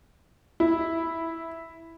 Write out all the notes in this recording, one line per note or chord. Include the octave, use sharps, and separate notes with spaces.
E4